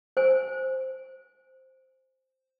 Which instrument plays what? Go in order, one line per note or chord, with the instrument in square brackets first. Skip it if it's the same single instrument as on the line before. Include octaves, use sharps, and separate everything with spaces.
[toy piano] C5 G#5